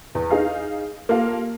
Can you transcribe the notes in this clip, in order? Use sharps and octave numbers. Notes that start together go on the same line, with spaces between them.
E2
D#4 G#4 F5
A#3 F4 G4 A4 F5